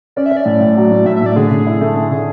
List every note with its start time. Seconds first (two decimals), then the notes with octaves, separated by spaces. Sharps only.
0.16 C#4 D5
0.26 E5
0.31 C#4
0.37 D5
0.46 A2
0.61 A2
0.77 F#3
0.92 A2
1.06 A2 E5
1.16 E5
1.21 A2 D5
1.36 D3 G#4
1.51 D3
1.67 E4
1.81 A3
1.96 A3 G#4
2.11 D3 G#4